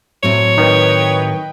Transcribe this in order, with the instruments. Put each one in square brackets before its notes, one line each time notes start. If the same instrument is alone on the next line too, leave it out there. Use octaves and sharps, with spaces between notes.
[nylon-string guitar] A2 F#3 C4 [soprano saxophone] C#5
[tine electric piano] D#3 [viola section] B4 D#5 G5